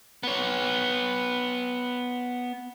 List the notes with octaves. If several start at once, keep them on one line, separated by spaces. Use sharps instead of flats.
B3 C#5